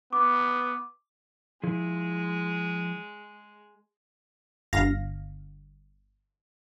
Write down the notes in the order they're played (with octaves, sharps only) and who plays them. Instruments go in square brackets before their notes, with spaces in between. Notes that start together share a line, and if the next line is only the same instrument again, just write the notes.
[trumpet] B3 [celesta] D6
[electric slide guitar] F3 E4 G#4 [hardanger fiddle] G#3
[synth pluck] G1 F5 A#6